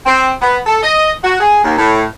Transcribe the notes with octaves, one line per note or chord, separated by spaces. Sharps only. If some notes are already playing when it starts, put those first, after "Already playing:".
C4
B3
A4
D#5
F#4
G#4
D#2
A2